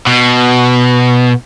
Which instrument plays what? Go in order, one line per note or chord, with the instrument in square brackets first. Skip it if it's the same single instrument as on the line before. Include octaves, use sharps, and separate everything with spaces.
[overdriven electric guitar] B2